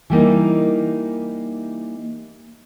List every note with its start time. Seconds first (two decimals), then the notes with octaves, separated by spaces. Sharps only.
0.10 E3 G3 A#3 D#4